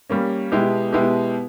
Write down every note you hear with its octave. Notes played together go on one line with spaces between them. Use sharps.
G3 A#3 C#4
B2 G#3 B3 E4 G4
B2 G#3 B3 E4 G4